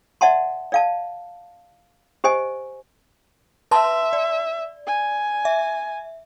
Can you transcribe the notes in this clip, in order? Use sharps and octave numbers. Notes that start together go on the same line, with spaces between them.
D5 E5 F#5 A5 C6
D5 F5 A5
G4 C5 D#5 G#5
B4 E5 A5 C6
D5
G#5
E5